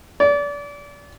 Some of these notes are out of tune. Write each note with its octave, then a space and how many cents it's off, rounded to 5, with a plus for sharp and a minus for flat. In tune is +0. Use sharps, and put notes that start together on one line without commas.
D5 -30